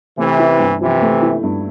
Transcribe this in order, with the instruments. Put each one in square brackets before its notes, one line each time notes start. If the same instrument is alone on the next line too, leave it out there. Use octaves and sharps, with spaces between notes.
[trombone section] C3 E3 [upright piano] A3
[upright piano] E4
G2
[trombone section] C3 E3 [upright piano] F3
[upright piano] A3
E4
G2